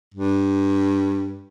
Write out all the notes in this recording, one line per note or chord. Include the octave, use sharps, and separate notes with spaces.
G2